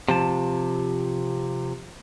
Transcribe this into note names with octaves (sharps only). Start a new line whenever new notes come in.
C3 F3 A5